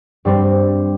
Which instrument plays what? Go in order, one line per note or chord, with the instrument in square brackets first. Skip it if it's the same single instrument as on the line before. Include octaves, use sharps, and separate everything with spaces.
[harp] G2 G3 C4